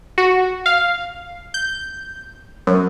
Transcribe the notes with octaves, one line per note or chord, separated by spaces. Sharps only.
F#4
F5
G6
F#2